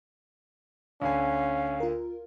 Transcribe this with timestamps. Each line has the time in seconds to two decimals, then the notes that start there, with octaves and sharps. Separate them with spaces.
1.02 D2 D3 C#4 F5 G#5
1.80 F4 A#4